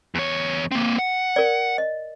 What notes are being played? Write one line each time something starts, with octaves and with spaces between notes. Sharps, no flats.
E2 C#5
A#3 C4
F#5
A#4 D5
D#5